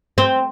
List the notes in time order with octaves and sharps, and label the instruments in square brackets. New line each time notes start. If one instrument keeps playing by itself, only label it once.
[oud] C4